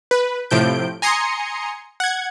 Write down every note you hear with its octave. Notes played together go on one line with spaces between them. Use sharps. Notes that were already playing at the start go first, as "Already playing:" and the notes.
B4
A2 C3 F3 G6 D7
G#5 A#5 C6 D#6 C#7
F#5 G#6